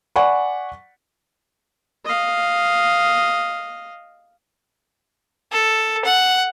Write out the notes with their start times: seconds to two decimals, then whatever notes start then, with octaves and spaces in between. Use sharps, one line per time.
0.16 D5 F#5 G#5 B5 C#6
2.05 D#5 F5
5.52 A4
6.05 F#5